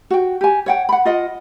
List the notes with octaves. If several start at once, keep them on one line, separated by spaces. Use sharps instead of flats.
F#4 G5
G4 G#5
C#5 F#5 G5
F#5 B5
F4 D#5 F#5